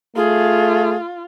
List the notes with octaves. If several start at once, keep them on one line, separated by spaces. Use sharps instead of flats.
A3 F4 G#4